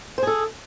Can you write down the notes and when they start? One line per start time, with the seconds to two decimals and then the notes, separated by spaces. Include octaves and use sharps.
0.18 C5
0.23 G#4
0.27 A4